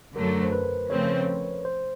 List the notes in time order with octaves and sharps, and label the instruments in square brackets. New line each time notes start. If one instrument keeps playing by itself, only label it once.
[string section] F#2 D3 F#3 A3 [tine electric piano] A#4
[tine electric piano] C5
B4
[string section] C#3 F3 A3 C4 [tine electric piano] C#5
[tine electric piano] C5